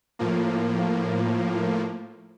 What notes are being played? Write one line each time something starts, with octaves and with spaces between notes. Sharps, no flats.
A2 F3 A#3